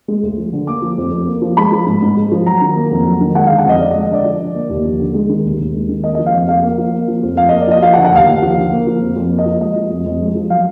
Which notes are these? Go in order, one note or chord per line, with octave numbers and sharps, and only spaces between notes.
G#3
D2
F3
D3
A#3 D6
F3
F2
F2
A#3
F3
G#3 B5
F3
G#2
G#2
G#3
F3
F#3 A#5
D#3
A#3
F2
F#3
D#3
G#3 F#5
F5
D3
F#5
F2 D#5
F2 D5
D#5
G#3
D#5
D3 D5
F3
D3
A#3
D#2
F3
D3
G#3
D#3
D#2
D#2
G#3
D#3
A#3 D#5
D#5
F3
F5
F2
F2 F5
A#3
F3
A#3
F3
F2
F2 F5
D#5
A#3
D5
F3 D#5
F3 F5
F#5
D3
F#5
D#2 F5
D#2
F3
D3
A#3
F3
F2
F2
A#3
D#5
F3
G#3 D#5
F3
F2
F2
G#3
F3
F#3 F5